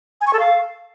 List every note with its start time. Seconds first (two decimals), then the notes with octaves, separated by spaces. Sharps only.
0.21 G#5
0.27 C#6
0.33 A4
0.39 F5